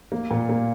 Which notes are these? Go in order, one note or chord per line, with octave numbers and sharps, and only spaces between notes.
A#3
A#2
A#3